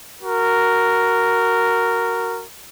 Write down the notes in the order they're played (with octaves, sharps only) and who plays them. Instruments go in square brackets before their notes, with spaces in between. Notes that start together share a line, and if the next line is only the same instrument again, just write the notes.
[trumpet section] F#4 A#4